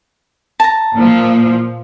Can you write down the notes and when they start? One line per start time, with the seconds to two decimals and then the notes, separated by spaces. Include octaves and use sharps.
0.60 A5 A#5
0.96 A#2 F3